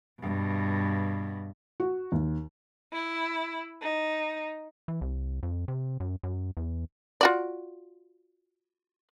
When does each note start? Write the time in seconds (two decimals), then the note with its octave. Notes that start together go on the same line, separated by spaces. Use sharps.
0.20 G2 B2
1.80 F#4
2.12 D#2
2.95 E4
3.82 D#4
4.88 E3
5.01 C2
5.43 F2
5.68 C3
6.00 F#2
6.23 F#2
6.57 E2
7.21 F4 F#4 D5